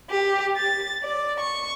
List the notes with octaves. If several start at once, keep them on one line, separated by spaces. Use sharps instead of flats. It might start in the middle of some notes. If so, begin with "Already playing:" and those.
G4
A6
D5
C#6